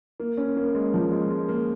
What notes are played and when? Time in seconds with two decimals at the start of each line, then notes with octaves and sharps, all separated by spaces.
0.20 A#3
0.37 C#4
0.56 A#3
0.75 G#3
0.94 F3
1.12 G#3
1.30 G#3
1.49 A#3